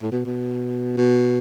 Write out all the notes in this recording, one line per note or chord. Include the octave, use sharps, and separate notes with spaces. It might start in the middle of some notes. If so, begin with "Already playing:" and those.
A2
B2
B2
B2